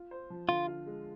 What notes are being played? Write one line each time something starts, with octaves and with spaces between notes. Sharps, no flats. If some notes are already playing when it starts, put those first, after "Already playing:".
Already playing: F4
C5
F3
D3 F4
F4
G#3